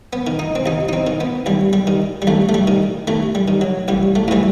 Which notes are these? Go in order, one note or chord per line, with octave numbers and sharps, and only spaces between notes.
B3
D#3
D#4
C4
D#2 D#4
D#4
C4
D#3
B3
D#2 G3
G3
D#3
G3
D#2 A3
A3
G3
D#3
D#2 A3
G3
D#3
F#3
A1 G3
A3
A2 E3 G3